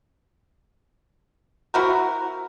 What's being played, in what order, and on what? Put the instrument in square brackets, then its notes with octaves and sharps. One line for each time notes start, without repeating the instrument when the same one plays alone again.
[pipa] C4 E4 F#4 A#4